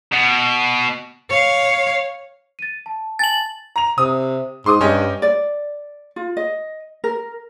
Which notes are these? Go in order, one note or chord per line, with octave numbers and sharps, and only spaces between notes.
B2
C#5 F5
A6 D#7
A5
G#5 A5 A6 F#7
A#5 F7
C3 D#6
G#2 C6 D6 D#6
G2 C#4 D#5 G5
D5
F4
D#5
A#4